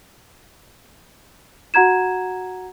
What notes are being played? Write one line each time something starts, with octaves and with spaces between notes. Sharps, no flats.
F#4 F#5 A#5 G#6 E7